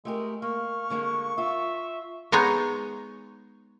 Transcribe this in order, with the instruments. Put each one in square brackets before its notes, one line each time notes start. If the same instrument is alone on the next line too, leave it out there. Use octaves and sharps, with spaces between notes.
[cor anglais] G#3 [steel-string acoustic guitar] A3 G4 A#4
[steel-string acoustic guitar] A#3 [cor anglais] F5 [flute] C#6
[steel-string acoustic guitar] D3 G#3 A#3
[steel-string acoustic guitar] F4 [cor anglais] E5
[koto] G#3 B3 D#4 C#5